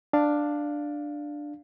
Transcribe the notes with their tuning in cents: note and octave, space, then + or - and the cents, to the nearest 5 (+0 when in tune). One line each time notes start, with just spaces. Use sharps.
D4 +5 F5 +0